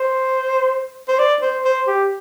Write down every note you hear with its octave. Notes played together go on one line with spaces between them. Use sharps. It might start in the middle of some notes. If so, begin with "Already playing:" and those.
Already playing: C5
C5
D5
C5
C5
G4